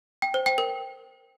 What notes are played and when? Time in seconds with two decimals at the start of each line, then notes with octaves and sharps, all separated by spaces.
0.22 G5
0.34 C5
0.46 G5
0.58 A#4